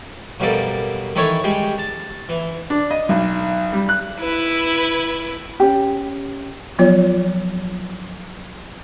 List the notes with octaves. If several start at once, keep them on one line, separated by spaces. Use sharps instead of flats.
F#2 B2 G3 A#3 A4
D#3 E3 E4 A4 C#5
G3 G#3 G4
A5
E3
D4
D#5
B1
G3
F#6
E4 B4
C#4 G4
F3 F#3 B3 F4 C#5